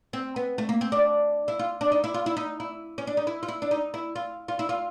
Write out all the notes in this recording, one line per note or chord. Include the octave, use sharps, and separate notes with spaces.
C4
B3
A3
A#3
C4
D4
E4
F4
D4
D#4
E4
F4
E4
D#4
E4
C#4
D4
D#4
E4
F4
E4
D4
D#4
E4
F4
F4
E4
F4